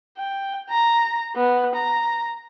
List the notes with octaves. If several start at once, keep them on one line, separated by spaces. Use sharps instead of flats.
G5
A#5
B3
A#5